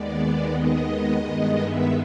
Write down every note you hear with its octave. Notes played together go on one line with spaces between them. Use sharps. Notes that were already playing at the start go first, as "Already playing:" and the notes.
Already playing: D#2 D#3 G#3 B3 D5
D#5
G2 D#3 G#3 B3
E5